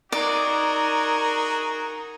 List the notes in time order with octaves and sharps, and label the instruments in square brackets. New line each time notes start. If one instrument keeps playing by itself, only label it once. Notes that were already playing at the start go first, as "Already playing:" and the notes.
[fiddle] D#4 [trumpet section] F#4 G#4 [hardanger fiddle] A#4 [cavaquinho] D5